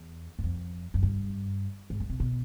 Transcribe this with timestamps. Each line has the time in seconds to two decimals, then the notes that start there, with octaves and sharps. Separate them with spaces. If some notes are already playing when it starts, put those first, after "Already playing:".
Already playing: E2
0.39 F#2
0.44 F2
0.94 F#2
1.03 G2
1.90 G#2
2.00 G2
2.10 C3
2.20 B2